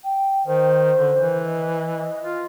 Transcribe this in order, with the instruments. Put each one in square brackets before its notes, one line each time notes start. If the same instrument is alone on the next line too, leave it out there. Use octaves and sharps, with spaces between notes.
[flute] G5
[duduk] D#3 [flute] C5
[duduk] D3
E3
[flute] D#5
[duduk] F4